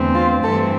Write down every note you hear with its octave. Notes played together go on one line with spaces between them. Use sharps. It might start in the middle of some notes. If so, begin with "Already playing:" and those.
Already playing: E2 D3 A3 C4
F4
G2 E3 A3 C4 A4